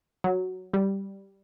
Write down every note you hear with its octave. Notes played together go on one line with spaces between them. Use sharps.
F#3
G3